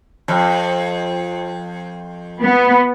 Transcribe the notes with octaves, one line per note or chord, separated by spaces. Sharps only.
F2
B3